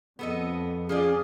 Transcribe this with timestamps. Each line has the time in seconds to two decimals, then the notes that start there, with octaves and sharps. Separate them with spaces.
0.19 F2 B3 A4 D#5
0.89 F3 C#4 F4 G#4 D5